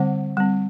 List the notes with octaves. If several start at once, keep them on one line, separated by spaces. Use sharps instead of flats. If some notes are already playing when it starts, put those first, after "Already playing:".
Already playing: D3 G3 C4 F#5
G3 C4